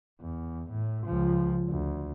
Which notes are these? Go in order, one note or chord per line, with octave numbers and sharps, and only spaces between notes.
E2
A2
C#2 F3
D2